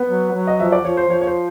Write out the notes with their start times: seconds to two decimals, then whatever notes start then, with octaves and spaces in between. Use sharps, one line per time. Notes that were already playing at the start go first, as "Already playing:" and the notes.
Already playing: B3 B4
0.10 F#3
0.34 F#3
0.47 D#5
0.60 F3 E5
0.72 D5
0.85 F3 C#5
0.97 C5
1.10 F3 C#5
1.21 C#5
1.27 C5